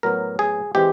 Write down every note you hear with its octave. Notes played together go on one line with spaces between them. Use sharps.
A2 F#3 B3 A#4
G#4
E3 G#3 C4 G4